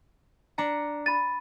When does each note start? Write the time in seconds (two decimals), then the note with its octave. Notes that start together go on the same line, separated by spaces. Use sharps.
0.58 D4 A#5 C#7
1.06 B5 A6 D#7